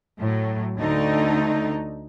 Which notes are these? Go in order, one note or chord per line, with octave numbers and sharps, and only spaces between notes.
A2 F#3
D2 D3 A3 D#4